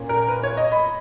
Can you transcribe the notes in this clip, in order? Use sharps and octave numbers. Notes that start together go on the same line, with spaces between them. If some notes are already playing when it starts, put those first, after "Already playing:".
Already playing: A#2 A#3 C#4
A#4
B4
C#5
D#5
B5